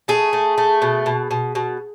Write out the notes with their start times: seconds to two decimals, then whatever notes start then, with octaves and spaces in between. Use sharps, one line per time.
0.08 A3 G#4
0.33 A3
0.58 A3
0.82 B2
1.06 B2
1.31 B2
1.55 B2